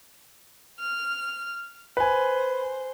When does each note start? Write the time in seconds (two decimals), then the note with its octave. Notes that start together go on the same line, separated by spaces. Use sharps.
0.79 F6
1.97 B4 C5 G#5